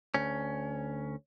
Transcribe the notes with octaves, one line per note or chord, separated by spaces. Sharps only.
D2 C#4